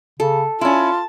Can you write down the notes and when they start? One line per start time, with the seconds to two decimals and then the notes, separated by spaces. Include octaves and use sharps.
0.20 C#3 A4
0.61 C#4 E4 F4 A5